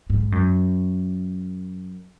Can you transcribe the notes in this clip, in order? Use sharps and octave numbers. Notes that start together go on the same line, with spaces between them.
G#2
F#2